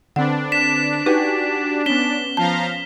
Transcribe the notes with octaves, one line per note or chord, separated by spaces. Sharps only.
D3 C4 D4 B4 F#5
B6 E7
D#4 F#4 G4 B4 G#5
B3 C#4 B6 E7 G7
F3 F5 A5 A#5